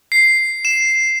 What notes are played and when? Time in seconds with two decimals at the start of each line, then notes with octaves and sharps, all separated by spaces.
0.12 C7
0.65 E7